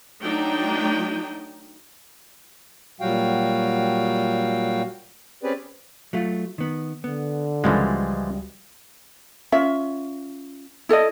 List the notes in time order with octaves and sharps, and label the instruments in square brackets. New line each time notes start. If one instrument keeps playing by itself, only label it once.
[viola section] F#3 A3 D4 D#4 G5
[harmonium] A#2 F#3 G3 F#4 F5 G5
C4 C#4 G4 G#4 B4 D5
[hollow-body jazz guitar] F#3 A3 F4
D#3 B3
[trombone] D3 [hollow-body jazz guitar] B3
[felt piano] C#2 [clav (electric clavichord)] E3 F3 G#3 [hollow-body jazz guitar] G3 F#4
[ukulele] C#4 F4 E5
E4 A4 D5 D#5